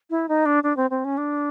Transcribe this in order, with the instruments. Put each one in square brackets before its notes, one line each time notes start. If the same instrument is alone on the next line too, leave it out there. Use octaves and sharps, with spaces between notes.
[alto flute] E4
D#4
D4
D4
C4
C4
C#4
D4